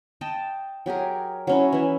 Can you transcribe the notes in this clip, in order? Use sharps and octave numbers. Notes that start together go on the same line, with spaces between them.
D#5 G5 A5
F#3 G4 G#4 A#4
F#3 C#4 E4
E3 E4